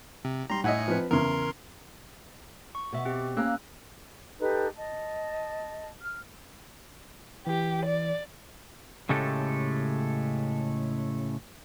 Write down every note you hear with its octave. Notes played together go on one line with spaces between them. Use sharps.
C3
G3 A#5 C6
A2 D#5 E5 F#5 G#5 C#7
F3 C4 B4
E2 C#3 A#4 C6
C#6
B2 E5 C#6
C4 G4
A#3 C#4 F5 A#5 E6 F#6
D#4 G4 A4 B4
D#5 A5
F6
E3 G4
D5
A2 C#3 G#3 A3 G4 A4